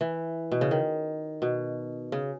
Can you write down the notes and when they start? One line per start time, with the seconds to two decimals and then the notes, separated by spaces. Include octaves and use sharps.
0.01 E3
0.52 B2
0.61 C#3
0.71 D#3
1.42 B2
2.12 C#3